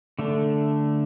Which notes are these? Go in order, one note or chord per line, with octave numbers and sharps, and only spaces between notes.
D3 A3 D4